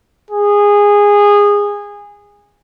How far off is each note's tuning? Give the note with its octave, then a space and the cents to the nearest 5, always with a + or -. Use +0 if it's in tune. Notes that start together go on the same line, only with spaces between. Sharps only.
G#4 -20